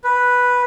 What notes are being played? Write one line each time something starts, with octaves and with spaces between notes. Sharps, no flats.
B4